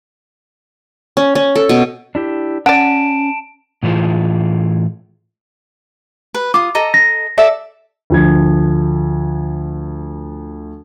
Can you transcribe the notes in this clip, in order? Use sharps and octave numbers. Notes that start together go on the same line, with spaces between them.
C#4
C#4
A4
B2
D4 E4 G4
C#4 D5 F#5 A5 D7 E7
A2 E3 C4 F4 G#4
B4
F4 D6 D#6
A4 D#5 A#5
A#6
A4 D5 E5
D2 F3 G#6